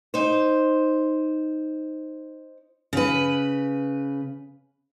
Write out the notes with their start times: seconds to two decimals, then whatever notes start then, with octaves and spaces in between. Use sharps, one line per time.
0.14 D#4 C5
2.93 C#3 B4